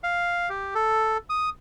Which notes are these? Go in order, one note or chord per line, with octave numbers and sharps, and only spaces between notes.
F5
G4
A4
D#6